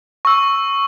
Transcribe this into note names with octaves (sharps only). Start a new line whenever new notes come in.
C#6 E6